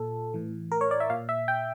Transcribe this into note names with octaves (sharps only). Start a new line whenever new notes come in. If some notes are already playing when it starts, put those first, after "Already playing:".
Already playing: A#2 A4
A2 E3
A#4
C#5
D5
E5
A#2 F5
E5
G5